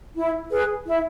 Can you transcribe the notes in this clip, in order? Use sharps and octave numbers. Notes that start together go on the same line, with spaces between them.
E4
G#4 B4
E4